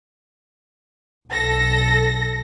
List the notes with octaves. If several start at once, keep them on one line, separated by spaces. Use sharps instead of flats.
B1 A4 A#6